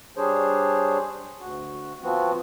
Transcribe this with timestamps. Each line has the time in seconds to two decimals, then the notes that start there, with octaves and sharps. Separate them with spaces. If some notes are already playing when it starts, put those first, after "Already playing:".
0.17 G3 D4 G#4 C5 C#5
1.40 D2 F#4
2.03 F3 B3 C4 F#4